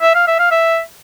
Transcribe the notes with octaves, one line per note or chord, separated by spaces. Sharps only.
E5
F5
E5
F5
E5